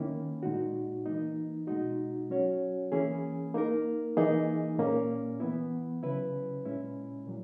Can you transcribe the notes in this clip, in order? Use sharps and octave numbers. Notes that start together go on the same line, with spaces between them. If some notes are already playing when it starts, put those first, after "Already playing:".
Already playing: D#3 A#3 C#4 E4
A#2 G#3 D#4 F#4
E3 A#3 D#4
B2 G#3 D#4 F#4
F#3 C#4 F#4 C#5
E3 A#3 C#4 E4 G#4
A#3 D#4 A#4
E3 A#3 D#4 G#4 D#5
A#2 A#3 C#4
E3 B3 E4
C#3 F#3 C#4 E4 B4
A#2 G#3 C#4 E4
A#2 F#3